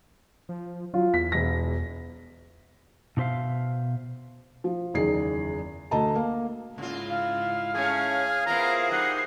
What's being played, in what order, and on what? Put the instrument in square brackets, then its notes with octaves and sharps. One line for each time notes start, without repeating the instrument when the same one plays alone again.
[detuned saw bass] F3
[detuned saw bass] F#3 [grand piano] F4
[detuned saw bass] E2 [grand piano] B6
[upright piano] E1 A#6
[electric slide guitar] B2 D#4 C5 E5 F5
[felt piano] F3
F#1 E2 D#3 D#4 G#4 C7
D2 A4 D#5 A5 A#5
A#3
[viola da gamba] G#2 E4 [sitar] C#3 F4
[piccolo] F5
[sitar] A3 C#4 [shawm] G#4
[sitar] B3 E4 F4 [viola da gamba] G#4 A#4 C5 [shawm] A#5
[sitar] G3 D#4 [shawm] F#5 [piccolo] C7